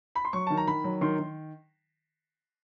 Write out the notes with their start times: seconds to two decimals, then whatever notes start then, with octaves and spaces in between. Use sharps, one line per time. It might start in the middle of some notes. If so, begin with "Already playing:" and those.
0.15 B5
0.25 C6
0.33 F#3 C#6
0.47 D#3 A5
0.57 A#5
0.67 D#3 B5
0.84 F#3
1.01 D#3 C6
1.19 D#3